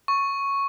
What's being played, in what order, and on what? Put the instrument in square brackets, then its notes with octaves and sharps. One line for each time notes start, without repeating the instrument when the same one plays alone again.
[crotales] C#6